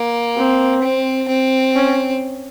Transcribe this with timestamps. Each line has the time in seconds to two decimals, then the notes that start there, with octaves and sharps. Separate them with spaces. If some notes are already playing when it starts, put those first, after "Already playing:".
Already playing: A#3
0.37 C4
0.83 C4
1.29 C4
1.76 C#4